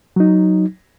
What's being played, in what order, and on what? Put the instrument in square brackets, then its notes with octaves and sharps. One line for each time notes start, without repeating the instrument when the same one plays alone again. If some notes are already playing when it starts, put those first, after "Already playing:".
[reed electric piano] F#3 D#4